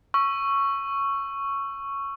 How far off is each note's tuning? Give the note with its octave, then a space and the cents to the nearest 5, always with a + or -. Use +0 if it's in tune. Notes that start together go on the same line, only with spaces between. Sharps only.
C#6 +0 E6 +25